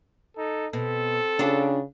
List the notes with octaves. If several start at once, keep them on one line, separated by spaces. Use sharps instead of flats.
D#4 A4
B2 C4 A4
C#3 D4 F4 G4